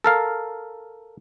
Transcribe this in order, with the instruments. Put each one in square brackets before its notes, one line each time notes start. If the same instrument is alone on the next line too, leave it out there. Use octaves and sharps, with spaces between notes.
[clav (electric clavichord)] A4 A#4 F5